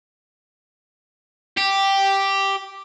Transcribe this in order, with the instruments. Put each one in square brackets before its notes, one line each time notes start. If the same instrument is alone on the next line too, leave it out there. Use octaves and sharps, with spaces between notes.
[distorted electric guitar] G4